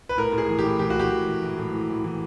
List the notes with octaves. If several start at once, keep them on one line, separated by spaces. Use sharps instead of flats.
B4
A2 A#4
A2
G#4
E3
G4
A2
E3 G4
F#4
E3 G4
E3
E3
E3
A2
E3
E3
E3